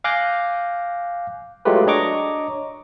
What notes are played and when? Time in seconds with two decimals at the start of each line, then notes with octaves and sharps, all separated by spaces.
0.04 F5 G#5 D6 F#6 G6 A#6
1.65 F#3 G#3 A3 F4 G4 B4
1.87 D4 C#5 D#5 A#5 C#6 D6